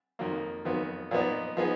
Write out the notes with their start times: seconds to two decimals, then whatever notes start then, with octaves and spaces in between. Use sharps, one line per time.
0.19 F2 D#3 F#3 A#3
0.65 F2 D#3 F#3 B3
1.11 A#2 F3 B3 D#4
1.57 F3 B3 D#4 G#4